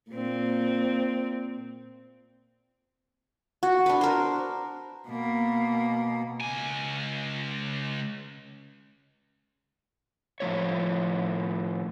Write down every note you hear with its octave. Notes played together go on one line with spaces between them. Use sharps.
A#2 C4
F#4
D4 B4
A#4 C5
B2 A#3
C#2 G#5
A2 F3 A#3 C#5